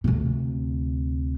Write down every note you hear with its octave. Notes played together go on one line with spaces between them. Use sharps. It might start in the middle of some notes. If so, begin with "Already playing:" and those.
D2 C3